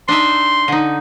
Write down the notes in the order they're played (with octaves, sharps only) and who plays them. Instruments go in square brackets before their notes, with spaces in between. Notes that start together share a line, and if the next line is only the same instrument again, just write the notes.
[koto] D4 D#4 E5 [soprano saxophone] C6
[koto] D3 D#4